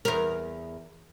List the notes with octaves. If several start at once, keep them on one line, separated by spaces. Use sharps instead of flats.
E2 A#4